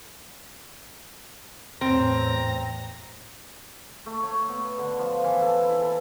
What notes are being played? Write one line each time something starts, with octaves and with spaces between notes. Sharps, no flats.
E2 A2 C4 A#5
A3
C#5
B3
D3
F3
E3
A4
E4
A4